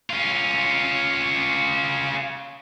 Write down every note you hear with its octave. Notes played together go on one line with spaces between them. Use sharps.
C#4 F4